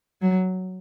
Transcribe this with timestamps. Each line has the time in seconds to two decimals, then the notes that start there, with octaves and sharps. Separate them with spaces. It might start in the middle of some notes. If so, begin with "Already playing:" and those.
0.22 F#3